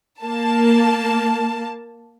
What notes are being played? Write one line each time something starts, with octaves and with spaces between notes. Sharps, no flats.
A#3 A5